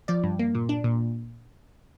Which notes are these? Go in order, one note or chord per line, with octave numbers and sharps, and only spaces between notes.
F3 D5
G2
A#3
A#2
D4
A#2